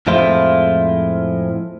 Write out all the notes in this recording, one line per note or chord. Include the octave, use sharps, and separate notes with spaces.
F2 A2 F3 G#3 E4 F4